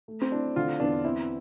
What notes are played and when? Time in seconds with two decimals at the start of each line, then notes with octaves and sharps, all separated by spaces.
0.08 A3
0.21 C4
0.32 D4 E4
0.56 D3 F4
0.80 E2 D4
1.04 C4 E4